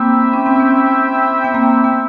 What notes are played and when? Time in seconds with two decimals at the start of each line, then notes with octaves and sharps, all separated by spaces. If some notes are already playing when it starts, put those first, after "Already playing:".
Already playing: A#3 C4 E4 G4 C5 E5 G5
0.33 C#4
0.46 C4
0.59 B3 C#4
1.44 B3
1.54 A#3 C4
1.84 B3